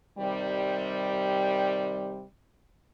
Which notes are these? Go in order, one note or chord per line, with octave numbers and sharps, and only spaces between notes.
C3 D#3 G3